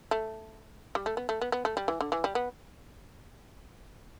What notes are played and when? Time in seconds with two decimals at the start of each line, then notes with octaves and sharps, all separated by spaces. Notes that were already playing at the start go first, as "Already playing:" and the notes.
0.11 A3
0.95 G3
1.06 A3
1.17 B3
1.29 A3
1.41 B3
1.52 B3
1.65 A3
1.77 G3
1.88 E3
2.01 D3
2.12 E3
2.24 G3
2.35 B3